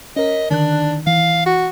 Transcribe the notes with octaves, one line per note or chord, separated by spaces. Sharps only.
C#4 A#4 D#5 B6
D3 D#3 D4 F#6
E3 F5
F#4